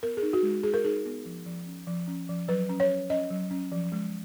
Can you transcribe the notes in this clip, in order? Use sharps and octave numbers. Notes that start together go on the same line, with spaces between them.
B3 A#4
G#4
D#4
F#4
G#3
G#3 G#4
A#4
D#4 G#4
B3
F3
F3
C#4
F3
C#4
F3
F#3 B4
C#4
C#5
C#4
C#4 D#5
F#3
C#4
F3
G#3